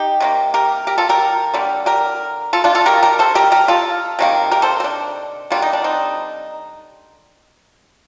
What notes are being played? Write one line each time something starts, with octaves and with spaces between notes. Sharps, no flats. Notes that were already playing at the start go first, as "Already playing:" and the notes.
Already playing: D#4 G4
C3 D#3 A#3
G4 A#4
G4 A#4
F4 A4
G4 A#4
D3 G3 A#3
G4 A#4
F4 A4
D4 F4
F4 A4
D#3 A#3 G4 A#4
G4 A#4
A4 C5
G4 A#4
G4 A#4
F4 A4
C3 D#3 A#3
G4 A#4
A4 C5
C4
D4
D3 G3 A#3 F4
D#4
D4
C4 D#4